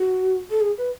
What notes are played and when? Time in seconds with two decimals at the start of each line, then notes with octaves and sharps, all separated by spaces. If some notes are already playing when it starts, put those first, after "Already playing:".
Already playing: F#4
0.50 A4
0.61 G#4
0.78 B4